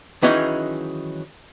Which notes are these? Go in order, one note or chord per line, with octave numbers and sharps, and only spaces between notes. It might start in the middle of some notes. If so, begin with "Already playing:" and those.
D#3 E3 F#3 G#3 C#4 D#4